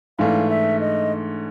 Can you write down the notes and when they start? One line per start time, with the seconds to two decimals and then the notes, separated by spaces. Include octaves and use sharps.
0.19 G#2 E3 A3 D4 F5
0.50 E5
0.80 D#5